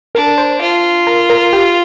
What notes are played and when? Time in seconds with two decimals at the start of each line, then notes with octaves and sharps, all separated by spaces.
0.15 D4 A#4
0.38 C5
0.61 F4
1.07 A#4
1.30 A#4
1.53 G4